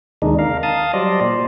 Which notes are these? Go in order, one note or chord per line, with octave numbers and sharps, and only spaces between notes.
D#2 C3 D#3 G#3 D4 D#4
A#4 F5
F5 A5 D#6
F#3 G3 C5 D5 D#5
A#2 C5